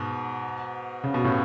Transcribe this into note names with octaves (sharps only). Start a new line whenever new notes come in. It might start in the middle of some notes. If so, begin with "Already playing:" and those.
Already playing: G#2 B2
C#3
B2
A2 C#3